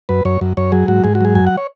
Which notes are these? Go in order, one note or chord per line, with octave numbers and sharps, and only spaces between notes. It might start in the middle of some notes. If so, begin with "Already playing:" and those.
F#2 B4
F#2 C#5
F#2
F#2 C#5
F#3 G#4
G#2 F#4
G#2 G#4
F#4
F#3 G#4
F#2 G#5
F#5
C#5